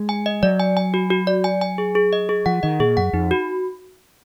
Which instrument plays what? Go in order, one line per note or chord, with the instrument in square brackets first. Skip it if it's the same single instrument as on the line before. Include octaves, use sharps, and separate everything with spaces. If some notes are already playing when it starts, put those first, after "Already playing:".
Already playing: [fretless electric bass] G#3
[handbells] G#5
D#5
[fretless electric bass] F#3 [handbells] D5
[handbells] G#5
G#5
F#4
F#4
D5
G#5
G#5
G#4
G#4
D#5
G#4
[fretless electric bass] F3 [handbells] F#5
[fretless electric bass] D#3 [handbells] D#5
[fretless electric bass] A#2 [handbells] G#4
[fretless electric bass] F#2 [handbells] F#5
[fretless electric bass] F2 [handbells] D#4
[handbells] F#4